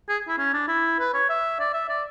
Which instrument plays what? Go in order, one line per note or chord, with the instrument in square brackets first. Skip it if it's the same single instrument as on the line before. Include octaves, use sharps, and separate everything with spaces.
[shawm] G#4
E4
C#4
D4
E4
B4
C#5
E5
D5
E5
D5